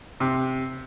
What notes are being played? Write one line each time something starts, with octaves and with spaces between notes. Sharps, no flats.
C3